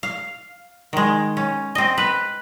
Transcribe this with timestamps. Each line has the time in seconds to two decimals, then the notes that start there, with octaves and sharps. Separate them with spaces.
0.03 F5
0.93 D#3 G#3
1.37 C#4
1.75 C4 D#5
1.98 B4